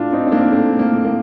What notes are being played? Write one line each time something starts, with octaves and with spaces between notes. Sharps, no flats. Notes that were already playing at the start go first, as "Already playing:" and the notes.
Already playing: A2 D4 F4
A2 C4 D#4
C4
A#3 D4
A2 A3 C4
A#3
A2
A#3